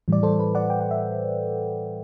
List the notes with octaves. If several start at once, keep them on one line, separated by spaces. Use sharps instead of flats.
A2 E3 G3 D5
A4 C5
B4
D5 F#5
G5
F#5
E5